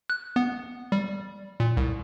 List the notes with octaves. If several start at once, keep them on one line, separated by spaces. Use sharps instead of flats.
F#6
B3
G3
A#2
C2